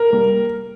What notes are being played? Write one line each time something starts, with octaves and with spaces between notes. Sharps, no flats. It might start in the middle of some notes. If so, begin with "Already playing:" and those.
Already playing: A#4
G3 A#3